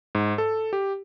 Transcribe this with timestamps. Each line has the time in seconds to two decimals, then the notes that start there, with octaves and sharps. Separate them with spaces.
0.15 G#2
0.38 A4
0.73 G4